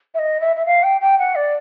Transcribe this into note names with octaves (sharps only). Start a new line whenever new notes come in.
E5
D#5
E5
E5
F5
G5
G5
F#5
D5